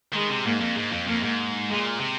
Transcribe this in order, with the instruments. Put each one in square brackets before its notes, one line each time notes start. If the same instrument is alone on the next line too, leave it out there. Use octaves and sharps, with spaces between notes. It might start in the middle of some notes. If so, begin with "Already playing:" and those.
[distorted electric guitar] D#3 [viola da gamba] G#3
[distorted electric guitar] C3
[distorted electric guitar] G#2 [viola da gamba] A#3
[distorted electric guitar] F2
G#2
F2
[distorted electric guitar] F2 [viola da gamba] A#3
[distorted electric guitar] G#2
[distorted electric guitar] A#2 [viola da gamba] G#3
[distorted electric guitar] C3